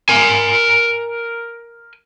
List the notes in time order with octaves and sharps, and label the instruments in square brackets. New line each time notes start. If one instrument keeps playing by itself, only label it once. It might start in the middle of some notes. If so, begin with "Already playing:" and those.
[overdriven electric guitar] A#4 G#5